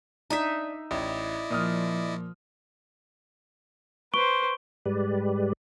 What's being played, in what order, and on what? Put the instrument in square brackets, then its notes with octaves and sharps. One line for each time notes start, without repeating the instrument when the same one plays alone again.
[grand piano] D4 [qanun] D#4 E5
[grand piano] A1 [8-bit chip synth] E4 D5 D#5
[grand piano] A#2 D#6 F6 [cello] F3
[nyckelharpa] B4 C5 [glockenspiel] C#6 D7 G7
[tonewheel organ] G#2 G3 G#3 G4 B4 D5